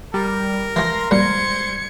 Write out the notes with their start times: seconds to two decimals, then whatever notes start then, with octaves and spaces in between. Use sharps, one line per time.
0.14 G3 A#4
0.76 E3 F3 C6 A#6
1.11 G2 A#2 G3 C5 G#6 C#7